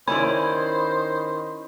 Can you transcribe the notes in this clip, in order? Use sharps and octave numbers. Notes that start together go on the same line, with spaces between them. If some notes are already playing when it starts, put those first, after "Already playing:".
D#3 C#4 E4 C5 D5 B5